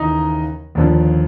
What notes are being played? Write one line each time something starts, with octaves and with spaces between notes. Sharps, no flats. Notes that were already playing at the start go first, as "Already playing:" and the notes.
Already playing: D#2 C#3 E3 D#4 D#5
D#2 D3 F3